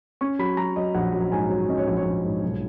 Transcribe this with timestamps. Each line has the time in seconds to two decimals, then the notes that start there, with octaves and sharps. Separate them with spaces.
0.21 C#4 C#6
0.39 F#3 B5
0.57 F#3 A#5
0.76 F#3 D#5
0.95 A#1 F#5
1.13 F#3
1.32 G#2 G#5
1.50 F#3
1.69 C#4 D#5
1.78 C#5
1.87 A#1
1.97 C#5
2.05 A#1
2.24 G#2
2.43 B1